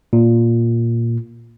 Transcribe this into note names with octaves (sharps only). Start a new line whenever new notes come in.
A#2